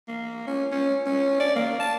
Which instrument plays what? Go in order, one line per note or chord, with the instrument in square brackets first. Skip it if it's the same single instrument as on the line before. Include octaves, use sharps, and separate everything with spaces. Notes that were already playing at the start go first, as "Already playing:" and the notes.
[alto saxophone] A#3
C#4
C#4
C#4
D5
A#3
A5